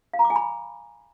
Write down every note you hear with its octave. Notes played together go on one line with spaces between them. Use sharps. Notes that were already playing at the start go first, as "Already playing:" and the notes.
F5
A#5
D6
G#5
B5